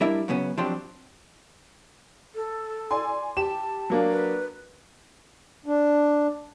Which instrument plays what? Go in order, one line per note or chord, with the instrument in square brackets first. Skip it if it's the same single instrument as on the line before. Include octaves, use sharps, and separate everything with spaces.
[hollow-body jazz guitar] G3 D4 E4 A#4 E5
F#2 C#3 B3 C#4
F3 F#3 C4 D4 G4 C5
[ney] A4
[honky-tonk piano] D5 G#5 C6
[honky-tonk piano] G4 [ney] A5 [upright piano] E7
[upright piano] F#3 A#3 D4
[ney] B4
[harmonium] D4